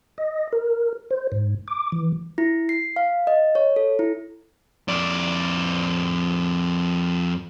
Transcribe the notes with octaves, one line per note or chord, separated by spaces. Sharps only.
D#5
A#4
C5
G#2
D6
E3
E4
C7
F5
D#5
C#5
A4
E4
F2 D5